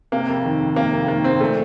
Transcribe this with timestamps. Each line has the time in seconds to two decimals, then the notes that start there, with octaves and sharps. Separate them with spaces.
0.12 C3 A#3
0.28 F2
0.45 D#3
0.60 F2
0.76 C3 A#3
0.93 F2
1.08 D#3 A#3
1.24 F2 C4
1.40 A#2 A3